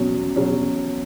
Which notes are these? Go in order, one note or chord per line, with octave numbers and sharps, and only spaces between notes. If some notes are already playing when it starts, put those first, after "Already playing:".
Already playing: E2 B2 F#3 C#4
E2 B2 F#3 C#4